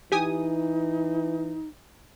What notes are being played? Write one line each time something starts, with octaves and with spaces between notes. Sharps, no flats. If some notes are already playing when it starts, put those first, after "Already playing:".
E3 D#4 G4 G#5 D#6